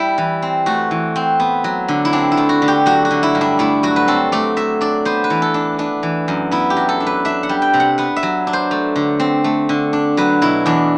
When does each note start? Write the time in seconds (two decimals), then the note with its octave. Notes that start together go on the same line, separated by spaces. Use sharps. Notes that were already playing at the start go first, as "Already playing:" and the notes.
Already playing: G3 E4
0.18 E3
0.42 C4
0.66 A3 F#4
0.91 E3
1.16 C4
1.40 B3
1.64 F#3
1.88 D3
2.05 E4
2.13 C4 D4
2.32 E4
2.37 A3
2.49 F#4
2.62 D3
2.68 G4
2.86 F#3 F#4
3.05 F#4
3.11 D3
3.23 E4
3.35 G2
3.41 D4
3.59 A3 E4
3.83 F#3 F#4
3.96 B4
4.08 C4 A4
4.32 A3 D5
4.57 F#3 E5
4.81 D4 D5
5.05 B3 C5
5.24 B4
5.30 E3
5.42 A4
5.54 D4
5.79 B3 D4
6.03 E3
6.28 F#2
6.51 B3 E4
6.70 G4
6.77 F#3
6.89 A4
7.00 D4
7.07 B4
7.25 D4 E5
7.43 F#5
7.49 G3
7.62 G5
7.74 C3
7.80 F#5
7.98 B3 F#5
8.16 E5
8.23 F#3
8.47 D4
8.53 C5
8.71 A3
8.96 D3
9.20 C4
9.44 A3
9.69 D3
9.93 D4
10.17 F#3 B4
10.42 B2 E4
10.66 E2 D4